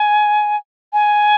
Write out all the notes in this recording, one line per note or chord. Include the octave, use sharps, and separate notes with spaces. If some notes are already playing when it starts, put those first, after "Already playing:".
Already playing: G#5
G#5